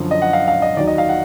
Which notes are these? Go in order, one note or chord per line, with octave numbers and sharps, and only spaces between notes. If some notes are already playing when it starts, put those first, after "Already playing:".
Already playing: F#2 D3 F3
D#5
F#5
F5
F5
D#5
D#2 D#3 F#3 D5
D#5
F5
F#5